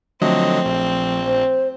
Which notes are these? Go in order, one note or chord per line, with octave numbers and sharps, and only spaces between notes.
D3 F3 F#3 A3 C4 D#5
A#1
C5